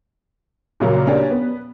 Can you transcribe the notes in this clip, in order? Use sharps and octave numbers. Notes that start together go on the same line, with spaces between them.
A#2 C#3 F#3 A#3
A#3 C#4 D4 G4
B3